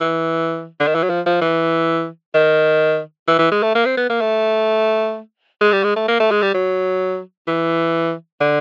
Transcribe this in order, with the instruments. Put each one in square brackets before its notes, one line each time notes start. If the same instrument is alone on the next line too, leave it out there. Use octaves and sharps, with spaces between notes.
[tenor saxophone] E3
D3
D#3
E3
F#3
F3
F3
E3
D#3
E3
E3
G#3
A3
A#3
C4
B3
A#3
A3
G#3
G3
G#3
A3
A#3
A3
G#3
G3
F#3
E3
D3